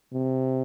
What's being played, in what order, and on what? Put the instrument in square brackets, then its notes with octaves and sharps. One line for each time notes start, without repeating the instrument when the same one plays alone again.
[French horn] C3